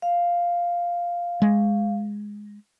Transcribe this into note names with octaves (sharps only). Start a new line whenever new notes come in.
F5
G#3